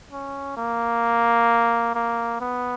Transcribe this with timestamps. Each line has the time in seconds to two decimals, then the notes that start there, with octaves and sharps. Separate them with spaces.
0.12 C#4
0.57 A#3
1.94 A#3
2.40 B3